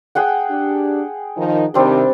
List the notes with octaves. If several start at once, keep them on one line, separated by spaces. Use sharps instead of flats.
G#4 F#5 G5
D4 G4
D#3 F3 D#4
C3 D#3 G3 C4 D4